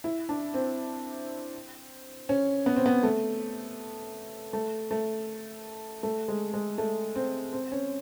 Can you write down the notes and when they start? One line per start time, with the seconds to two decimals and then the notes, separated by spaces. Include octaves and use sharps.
0.04 E4
0.29 D4
0.54 C4
2.29 C#4
2.66 B3
2.76 C4
2.86 B3
3.03 A3
4.53 A3
4.91 A3
6.03 A3
6.28 G#3
6.53 G#3
6.78 A3
7.16 C4
7.53 C4
7.72 C#4